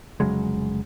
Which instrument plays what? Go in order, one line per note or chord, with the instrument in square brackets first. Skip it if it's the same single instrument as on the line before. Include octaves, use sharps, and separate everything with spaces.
[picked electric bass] F1 C#3 F#3 G#3